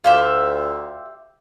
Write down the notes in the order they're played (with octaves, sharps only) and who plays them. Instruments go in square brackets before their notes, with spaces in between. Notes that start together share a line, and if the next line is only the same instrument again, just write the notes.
[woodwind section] D2 [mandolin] F4 G4 E5 [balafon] F5